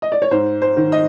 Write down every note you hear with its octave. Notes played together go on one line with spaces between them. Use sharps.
D#5
D5
C#5
G#2 C5
C5
D#3
D#5